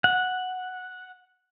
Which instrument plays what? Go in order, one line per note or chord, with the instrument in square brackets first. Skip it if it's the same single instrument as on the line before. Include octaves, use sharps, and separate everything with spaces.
[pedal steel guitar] F#5